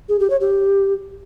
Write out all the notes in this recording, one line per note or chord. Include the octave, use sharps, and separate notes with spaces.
G#4
G4
C#5
G4